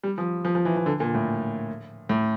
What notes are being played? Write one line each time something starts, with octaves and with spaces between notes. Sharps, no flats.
G3
F3
F3
F3
E3
E3
D3
A#2
A2
A2